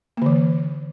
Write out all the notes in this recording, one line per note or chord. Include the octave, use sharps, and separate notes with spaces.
D3 E3 A#3